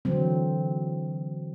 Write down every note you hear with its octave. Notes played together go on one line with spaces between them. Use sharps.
D3 E3 F#3 C4